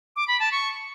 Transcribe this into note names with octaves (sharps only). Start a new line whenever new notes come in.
D6
B5
A5
C#6